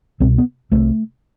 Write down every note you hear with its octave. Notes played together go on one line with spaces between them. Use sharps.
C2 B2 C4
B3
C2 C3 A3